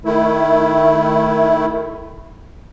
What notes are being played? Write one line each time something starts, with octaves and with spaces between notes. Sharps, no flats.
D#3 A3 E4